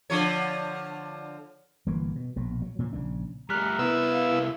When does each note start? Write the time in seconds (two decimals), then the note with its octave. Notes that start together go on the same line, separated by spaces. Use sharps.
0.10 D3 F3 C#5
1.86 G1 E3 A#3
2.16 B2
2.36 A#1 B2
2.62 F#3
2.79 A#2 C#3 F3
2.93 A#1 C#3 D4
3.50 G3 A3 A#5 F6 F#6 B6
3.79 C2 B3 E4 E6
4.12 F5